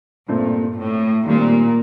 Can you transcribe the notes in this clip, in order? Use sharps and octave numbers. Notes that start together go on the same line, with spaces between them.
G2 A#2 A3 C4
A2
A#2 D#3 G3 C4